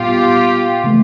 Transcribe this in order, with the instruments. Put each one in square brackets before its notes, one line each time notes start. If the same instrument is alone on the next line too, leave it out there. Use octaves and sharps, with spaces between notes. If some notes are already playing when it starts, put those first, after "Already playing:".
Already playing: [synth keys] A#2 G3 B3 [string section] F4 G4
[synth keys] C#3 E3 A3